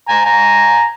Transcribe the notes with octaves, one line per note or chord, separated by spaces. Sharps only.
G#5 A#5
G#5 A#5